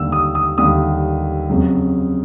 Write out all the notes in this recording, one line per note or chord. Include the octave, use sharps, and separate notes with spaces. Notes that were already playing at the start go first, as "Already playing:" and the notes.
Already playing: D#2 D3 G3 A#3 E6
D#6
D#6
D#2 D3 G3 A#3 D#6
F2 C#3 F#3